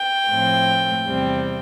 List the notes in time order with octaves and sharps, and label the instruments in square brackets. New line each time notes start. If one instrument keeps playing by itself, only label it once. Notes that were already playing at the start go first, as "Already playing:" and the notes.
Already playing: [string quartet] G5
A2 F3 A3 C4
E2 C3 G3 C4